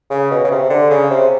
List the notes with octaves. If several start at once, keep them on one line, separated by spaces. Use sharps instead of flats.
C#3
B2
C#3
C3
D3
C#3
C3